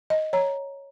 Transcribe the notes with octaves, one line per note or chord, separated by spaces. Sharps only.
D#5
C#5 A#5